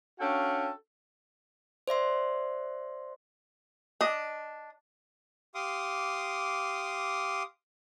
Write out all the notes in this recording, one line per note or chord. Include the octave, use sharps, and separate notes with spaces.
C#4 D4 F#4 A4 F5 G5
C5 D5 E5 C6
D4 D#5
G4 F5 C6 D6 D#6